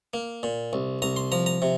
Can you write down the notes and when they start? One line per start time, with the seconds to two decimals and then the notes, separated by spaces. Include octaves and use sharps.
0.14 A#3
0.43 A#2
0.73 C2
1.02 C2 A#5
1.16 C6
1.32 F3 A#5
1.46 A#5
1.62 C3